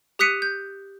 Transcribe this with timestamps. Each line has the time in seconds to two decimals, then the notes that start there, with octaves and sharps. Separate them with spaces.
0.19 G4 D#6 F#6 B6 C#7 D#7
0.42 G6